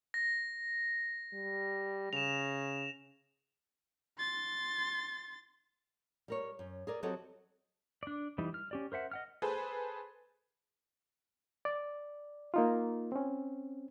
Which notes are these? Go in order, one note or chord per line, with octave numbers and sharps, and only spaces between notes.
A#6
G3
C#3 E7 F7
C6 A6
G3 A#4 C#5
F#2
G#4 A#4 D5
F#3 C4 G4 A4 C#5 D#5
D4 D5
E3 G3 D#4
F6
C#4 G4 D5
A#4 C5 E5 F#5
D#5 F#5 F6
G#4 A4 B4 C5
D5
A#3 D#4 F4
C4 C#4